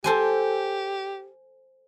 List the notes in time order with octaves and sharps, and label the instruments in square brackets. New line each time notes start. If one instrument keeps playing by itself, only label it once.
[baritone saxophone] G4 [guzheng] A4 C5 G#5